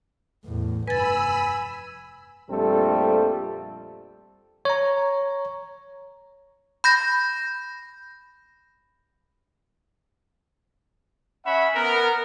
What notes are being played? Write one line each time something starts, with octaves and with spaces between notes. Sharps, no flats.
E2 A2
F1 G2 B4 G#5 B5 E6 A6
A#1 F2 G3 A3 C4 A4
C#5 A#5
B5 G6 A#6
C#4 E5 F#5 B5
B3 A#4